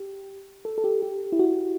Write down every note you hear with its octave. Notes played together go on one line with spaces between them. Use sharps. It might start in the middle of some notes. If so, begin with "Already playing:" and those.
Already playing: G4
A4
A4
G4
G4
E4
F#4